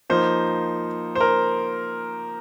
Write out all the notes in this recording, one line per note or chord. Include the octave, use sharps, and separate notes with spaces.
F3 A#3 D#4 C5
C5
A#4